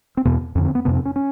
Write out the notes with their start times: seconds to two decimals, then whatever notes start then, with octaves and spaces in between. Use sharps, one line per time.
0.17 C4
0.25 E2 B2 B3
0.55 F2 D3 C#4
0.65 C4
0.75 B3
0.85 F2 C3 B3
0.95 C4
1.05 C#4
1.16 C#4